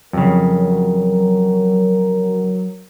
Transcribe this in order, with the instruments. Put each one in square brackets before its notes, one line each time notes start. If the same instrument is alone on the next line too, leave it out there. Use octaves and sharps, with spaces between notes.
[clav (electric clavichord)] F2 C#3 [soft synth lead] F#3 [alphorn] A#4